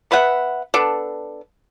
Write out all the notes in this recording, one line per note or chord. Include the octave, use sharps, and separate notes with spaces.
B3 B4 E5 F#5
B3 D4 A4